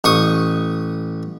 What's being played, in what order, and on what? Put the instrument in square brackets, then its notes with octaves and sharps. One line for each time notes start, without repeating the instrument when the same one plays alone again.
[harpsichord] A1 C#6 D#6